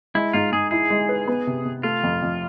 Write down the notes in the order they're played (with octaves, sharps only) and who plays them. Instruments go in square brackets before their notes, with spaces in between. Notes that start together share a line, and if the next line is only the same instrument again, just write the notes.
[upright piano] G#3 [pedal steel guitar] E4
[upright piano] G#2 [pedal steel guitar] F4
[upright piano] G#2 [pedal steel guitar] G#4
[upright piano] E4 [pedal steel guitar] G#4
[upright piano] G#3
B4
B3
C3
C3
[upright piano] A3 [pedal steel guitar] F4
[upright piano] F2
F2